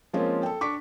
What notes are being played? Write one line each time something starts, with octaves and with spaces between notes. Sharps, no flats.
F3 G#3 A#3 C4 C#4 F4
A4 G5
D4 C#6 D6 B6